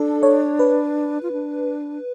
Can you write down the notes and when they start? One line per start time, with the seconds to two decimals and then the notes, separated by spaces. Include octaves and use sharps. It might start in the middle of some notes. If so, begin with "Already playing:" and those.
Already playing: D4 A4
0.23 C#5
0.59 B4
1.23 F4
1.32 D4